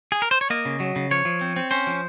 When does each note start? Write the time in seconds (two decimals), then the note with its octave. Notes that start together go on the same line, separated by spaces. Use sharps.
0.12 G#4
0.22 A#4
0.31 C5
0.41 C#5
0.50 A#3 D#5
0.65 C#3
0.80 F#3
0.96 C#3
1.11 F3 C#5
1.25 F3
1.41 C4
1.56 C4
1.71 C#4 C5
1.87 F3